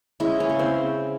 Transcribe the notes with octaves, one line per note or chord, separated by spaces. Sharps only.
G#3 C#4 E4
C#4
C#3
C4